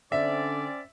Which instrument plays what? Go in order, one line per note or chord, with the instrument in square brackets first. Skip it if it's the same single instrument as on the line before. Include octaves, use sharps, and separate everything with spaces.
[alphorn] D3 [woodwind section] C4 C#4 D5 [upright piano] E5